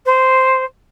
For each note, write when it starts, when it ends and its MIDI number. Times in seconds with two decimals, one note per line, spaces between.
0.05 0.64 72